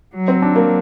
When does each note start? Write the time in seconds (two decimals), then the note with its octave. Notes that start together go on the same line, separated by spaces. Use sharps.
0.15 F#3
0.28 C4
0.42 D4
0.56 A#3